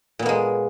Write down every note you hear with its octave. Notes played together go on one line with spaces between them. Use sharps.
A#2 G#3 A#3 B3